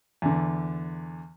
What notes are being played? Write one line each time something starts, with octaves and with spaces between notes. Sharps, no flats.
E2 D3